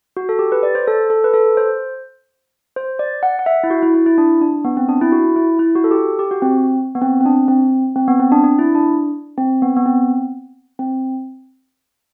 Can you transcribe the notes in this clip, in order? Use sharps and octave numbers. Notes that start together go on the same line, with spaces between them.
F#4
A4
G4
B4
D5
C5
A4
A4
B4
A4
C5
C5
D5
F#5
F#5
E5
E4
F#4
E4
E4
E4
D4
D4
B3
C4
D4
E4
F#4
E4
E4
F#4
A4
G4
G4
F#4
C4
B3
C4
C4
D4
C4
C4
B3
C4
D4
D4
E4
D4
C4
B3
B3
C4
C4